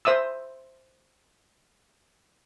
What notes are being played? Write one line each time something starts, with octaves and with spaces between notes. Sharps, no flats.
C5 E5 D#6 E6